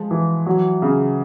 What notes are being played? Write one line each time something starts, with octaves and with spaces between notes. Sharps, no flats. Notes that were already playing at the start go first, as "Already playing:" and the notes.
Already playing: F3 G#3
E3
F#3
C#3